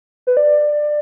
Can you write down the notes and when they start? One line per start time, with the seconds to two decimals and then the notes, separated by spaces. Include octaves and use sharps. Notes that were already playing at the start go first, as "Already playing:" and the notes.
0.27 B4
0.37 D5